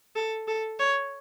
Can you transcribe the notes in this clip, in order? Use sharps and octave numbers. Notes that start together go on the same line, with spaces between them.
A4
A4
C#5